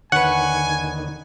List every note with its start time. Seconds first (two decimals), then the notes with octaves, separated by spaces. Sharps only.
0.12 D#2 D3 D#3 B4 C#5 F#5 G#5